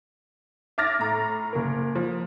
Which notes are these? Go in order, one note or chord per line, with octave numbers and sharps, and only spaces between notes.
E5 D6 F6 A6 A#6
A2 A#5
F#1 A#4
F3